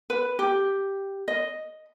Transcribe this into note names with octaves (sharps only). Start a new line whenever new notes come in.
B4
G4
D#5